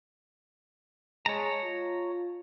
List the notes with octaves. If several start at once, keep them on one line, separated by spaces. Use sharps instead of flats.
G#3 C#5 A5 A#5
F4